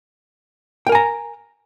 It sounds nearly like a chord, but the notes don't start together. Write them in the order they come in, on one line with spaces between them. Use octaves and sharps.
G5 A#4 G#5 A#5